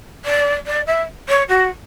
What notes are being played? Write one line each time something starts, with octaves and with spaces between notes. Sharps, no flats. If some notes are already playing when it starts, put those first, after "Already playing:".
D5
D5
E5
C#5
F#4